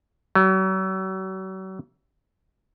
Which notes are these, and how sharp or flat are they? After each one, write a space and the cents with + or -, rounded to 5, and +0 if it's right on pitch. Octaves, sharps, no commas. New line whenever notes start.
F#3 +40